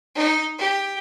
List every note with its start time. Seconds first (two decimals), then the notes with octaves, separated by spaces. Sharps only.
0.15 D#4
0.58 G4